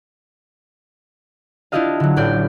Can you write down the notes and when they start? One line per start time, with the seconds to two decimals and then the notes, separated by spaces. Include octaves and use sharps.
1.72 D4 E4 F4 G4 D#5 F5
2.00 D3 F#3
2.16 A1 A2 D5 G6